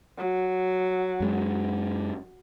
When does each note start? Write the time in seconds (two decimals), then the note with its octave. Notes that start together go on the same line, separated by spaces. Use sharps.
0.18 F#3
1.20 F#2 G#3